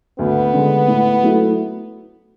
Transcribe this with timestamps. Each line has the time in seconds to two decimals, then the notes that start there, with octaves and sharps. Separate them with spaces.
0.19 D2 B3
0.54 D3 G#3
0.88 A2
1.23 F#3 A3 E4